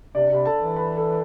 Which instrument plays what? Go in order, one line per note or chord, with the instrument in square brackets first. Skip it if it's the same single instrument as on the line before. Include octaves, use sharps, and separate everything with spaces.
[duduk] C3 [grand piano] D4 D5
[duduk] C3 [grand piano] B5
[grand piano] A4 A5
[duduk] E3
[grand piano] B4 B5
A4 A5